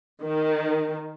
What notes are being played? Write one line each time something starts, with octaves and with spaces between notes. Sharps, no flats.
D#3